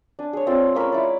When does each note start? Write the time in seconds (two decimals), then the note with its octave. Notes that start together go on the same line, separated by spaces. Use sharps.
0.19 D4 G#5
0.33 G#4 C#5
0.47 C4 F4 A4 D5
0.75 G#3 A#3 C#4 B5
0.92 E4 D5